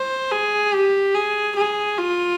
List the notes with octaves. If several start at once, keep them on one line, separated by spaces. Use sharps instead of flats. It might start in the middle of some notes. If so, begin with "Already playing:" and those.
Already playing: C5
G#4
G4
G#4
G#4
F4